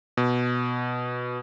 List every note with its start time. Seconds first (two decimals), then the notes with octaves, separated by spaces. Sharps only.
0.17 B2